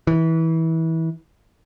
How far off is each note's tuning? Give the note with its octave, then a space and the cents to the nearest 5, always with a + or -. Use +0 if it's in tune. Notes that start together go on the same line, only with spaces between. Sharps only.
E3 -25